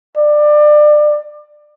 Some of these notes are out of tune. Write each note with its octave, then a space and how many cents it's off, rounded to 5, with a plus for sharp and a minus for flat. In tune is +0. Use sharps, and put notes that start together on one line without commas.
D5 +25